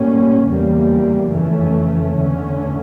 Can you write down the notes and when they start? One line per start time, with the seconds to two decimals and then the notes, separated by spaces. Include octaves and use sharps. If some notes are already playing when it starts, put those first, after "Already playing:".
Already playing: A2 G3 A#3 C#4
0.46 E2 C#3 G3 A#3
1.30 F2 C#3 E3 A3 C#4
2.15 E2 D3 A3 C#4